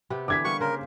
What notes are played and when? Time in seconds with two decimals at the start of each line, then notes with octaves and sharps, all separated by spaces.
0.10 C3 B3 G4
0.28 D3 E3 D6 G#6 B6
0.45 G3 A#3 B4 C#6
0.60 C#3 A#4 C5